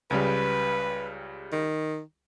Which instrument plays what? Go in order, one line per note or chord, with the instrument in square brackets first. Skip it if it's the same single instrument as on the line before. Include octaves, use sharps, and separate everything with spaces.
[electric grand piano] C#2 C#3 G3 [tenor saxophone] B4
[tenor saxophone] D#3